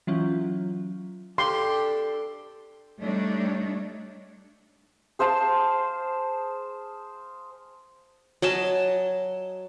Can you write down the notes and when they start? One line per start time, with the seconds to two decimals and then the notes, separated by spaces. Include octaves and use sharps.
0.07 E3 F#3 C#4 F4
1.38 D4 G4 A4 C6
3.00 G3 A3 D4 D#4 C#5
5.19 G#4 C5 F5 A5
8.42 F#3 D#5 G#5 A5